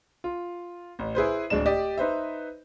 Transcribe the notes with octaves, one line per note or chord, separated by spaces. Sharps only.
F4
A1
E4 G#4 B4 C5
D1 G#3 D4 E7
G4 D5 D#5
D#4 B4 C5 E5